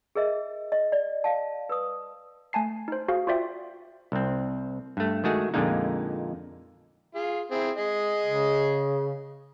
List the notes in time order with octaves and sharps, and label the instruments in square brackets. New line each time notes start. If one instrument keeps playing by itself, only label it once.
[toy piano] G#4 A#4 D#5 E5
D#5
D5
F5 A5
B4 D#6
[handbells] A3 G#5 A5 C7
D#4 C5
F#4 G#4 C5 F5
F4 F#4 C5 D5 E5 G5
[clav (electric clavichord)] C2 C4
G2 A3
D#3 G#3 A3 F#4 G#4
F2 A#2 D3 G#3 A#3 D#4
[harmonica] F4 G#4
C4 E4 G#4
G#4 D#5
[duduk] C#3